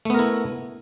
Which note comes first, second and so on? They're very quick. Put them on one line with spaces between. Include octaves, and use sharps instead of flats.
A3 B3 A#4 E4